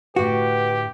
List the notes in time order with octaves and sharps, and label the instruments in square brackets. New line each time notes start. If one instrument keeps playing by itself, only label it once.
[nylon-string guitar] A2 D3 [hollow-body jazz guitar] F#4 [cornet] G4 [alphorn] B4